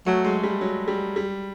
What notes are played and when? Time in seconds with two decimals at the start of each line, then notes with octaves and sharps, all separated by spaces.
0.06 F#3 A3
0.24 G#3
0.43 G3
0.61 F#3
0.88 G3
1.16 G3